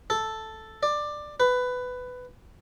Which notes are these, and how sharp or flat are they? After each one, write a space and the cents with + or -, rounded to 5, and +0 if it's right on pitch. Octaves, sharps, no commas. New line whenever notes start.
A4 +0
D5 +15
B4 +15